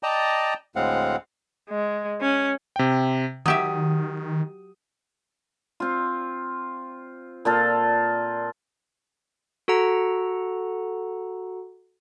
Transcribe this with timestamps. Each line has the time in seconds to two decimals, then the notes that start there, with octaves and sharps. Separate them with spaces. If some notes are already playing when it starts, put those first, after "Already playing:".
0.03 D5 D#5 G5 A5 A#5
0.76 D2 A2 G#3 C4 F5 F#5
1.70 G#3
2.21 C#4
2.76 C3 G5
3.46 D#3 F#3 G4 E5 D#6
5.80 C4 F4
7.45 A#2 F4 A4
9.68 F#4 A4 F#5 A#5